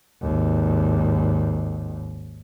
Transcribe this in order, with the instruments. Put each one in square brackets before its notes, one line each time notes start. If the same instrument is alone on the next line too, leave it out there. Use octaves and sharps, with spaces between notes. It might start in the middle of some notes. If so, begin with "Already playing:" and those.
[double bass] G#1 D#2